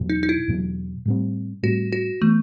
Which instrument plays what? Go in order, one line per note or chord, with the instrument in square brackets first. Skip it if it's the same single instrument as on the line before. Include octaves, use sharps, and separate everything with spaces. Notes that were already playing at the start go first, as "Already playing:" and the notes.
Already playing: [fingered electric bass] E2 B2 F#3
[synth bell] D#4
D#4
E4
[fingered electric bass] E2 B2 F#3
A2 G3 C4
[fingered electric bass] A2 G3 C4 [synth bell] F#4
[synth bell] F#4
[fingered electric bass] E3 B3 [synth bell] A3